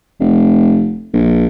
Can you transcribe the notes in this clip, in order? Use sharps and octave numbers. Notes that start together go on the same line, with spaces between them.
F1
A#1